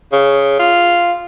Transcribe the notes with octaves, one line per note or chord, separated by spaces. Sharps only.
C#3
F4